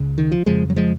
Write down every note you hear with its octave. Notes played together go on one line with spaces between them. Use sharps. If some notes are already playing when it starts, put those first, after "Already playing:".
Already playing: C#2 C#3
D#3
F3
F2 C#3 F3 G#3
F#3
F3 G#3